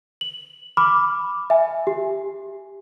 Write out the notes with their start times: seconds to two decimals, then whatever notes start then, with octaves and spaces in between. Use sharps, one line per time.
0.21 F#7
0.77 B5 D6 F6
1.50 E5 G#5
1.87 G4